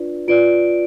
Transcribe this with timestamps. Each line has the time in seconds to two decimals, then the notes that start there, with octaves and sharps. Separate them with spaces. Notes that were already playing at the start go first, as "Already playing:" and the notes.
Already playing: D4 F4 B4 D5
0.28 F4 B4 D5 D7